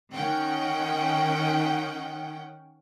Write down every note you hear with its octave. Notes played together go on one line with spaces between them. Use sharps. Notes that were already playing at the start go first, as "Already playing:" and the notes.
D#3 C#4 F#5 G5